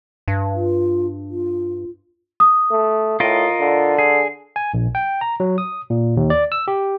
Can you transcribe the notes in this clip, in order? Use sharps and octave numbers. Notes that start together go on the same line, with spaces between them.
G2
F4
F4
D#6
A3
A2 F4 A#4 D#5
D3
G#4
G#5
A#1
G5
A#5
F#3
D#6
A#2
D#2
D5
E6
G4